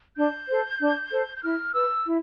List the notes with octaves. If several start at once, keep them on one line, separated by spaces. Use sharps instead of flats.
D4 G6
A4 C5
D4
A4 C5
G6
E4 F6
B4 E6
E4